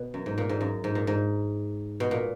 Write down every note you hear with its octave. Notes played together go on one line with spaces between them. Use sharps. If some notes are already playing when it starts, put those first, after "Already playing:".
Already playing: B2
F#2
G#2
A#2
G#2
F#2
G#2
A#2
G#2
B2
A#2